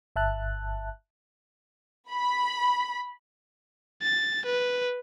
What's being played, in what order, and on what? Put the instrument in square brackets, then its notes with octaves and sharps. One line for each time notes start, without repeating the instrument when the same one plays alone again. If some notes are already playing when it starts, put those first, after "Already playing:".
[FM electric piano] G1 E5 A5 F#6
[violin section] B5
[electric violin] A6
B4